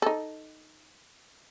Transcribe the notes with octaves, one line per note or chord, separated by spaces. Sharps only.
D#4 A4